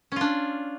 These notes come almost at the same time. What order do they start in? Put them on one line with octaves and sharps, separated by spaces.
C#4 F4 D4